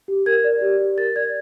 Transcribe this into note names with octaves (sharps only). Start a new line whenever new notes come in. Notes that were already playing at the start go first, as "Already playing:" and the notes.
G4
A#4 G#6
D5
G4
G4
A#4 A6
D5 G#6